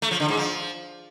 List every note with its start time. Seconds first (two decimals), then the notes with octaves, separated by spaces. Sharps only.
0.02 A3
0.11 F3
0.20 D3
0.29 G#2
0.37 F3